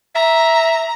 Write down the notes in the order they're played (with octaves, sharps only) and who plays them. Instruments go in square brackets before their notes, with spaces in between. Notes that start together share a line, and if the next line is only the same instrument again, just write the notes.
[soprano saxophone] E5 [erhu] A#5